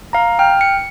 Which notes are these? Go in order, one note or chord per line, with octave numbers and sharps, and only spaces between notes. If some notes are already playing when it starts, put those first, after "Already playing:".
F5 A#5
G5 F6
C#7